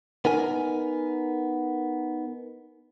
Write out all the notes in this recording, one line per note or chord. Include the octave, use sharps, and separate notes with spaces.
B3 D#4 A#4 G#5